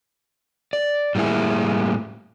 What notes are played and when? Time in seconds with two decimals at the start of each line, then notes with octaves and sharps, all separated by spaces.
0.73 D5
1.15 A2 G3 A#3 E4 G#4